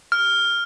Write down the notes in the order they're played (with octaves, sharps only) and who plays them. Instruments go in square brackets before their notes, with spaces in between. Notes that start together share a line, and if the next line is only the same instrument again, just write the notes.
[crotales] F6